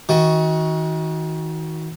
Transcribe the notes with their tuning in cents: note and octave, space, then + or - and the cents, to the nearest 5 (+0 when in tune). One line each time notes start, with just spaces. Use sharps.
D#3 +35 F#4 +0